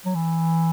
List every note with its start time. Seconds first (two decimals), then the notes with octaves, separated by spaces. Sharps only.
0.05 F#3
0.15 E3